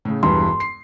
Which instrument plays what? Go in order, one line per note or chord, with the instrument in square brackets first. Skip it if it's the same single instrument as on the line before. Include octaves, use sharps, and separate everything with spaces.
[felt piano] A2 C#3
[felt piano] E1 G2 E3 [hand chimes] C6
[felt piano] C7